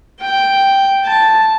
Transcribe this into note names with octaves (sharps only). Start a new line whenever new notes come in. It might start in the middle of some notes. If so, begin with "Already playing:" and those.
G5
A5